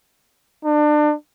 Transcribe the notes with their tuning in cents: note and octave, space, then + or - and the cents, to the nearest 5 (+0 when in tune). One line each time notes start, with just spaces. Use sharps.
D4 +30